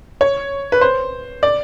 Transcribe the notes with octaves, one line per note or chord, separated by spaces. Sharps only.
C#5
B4
C5
D5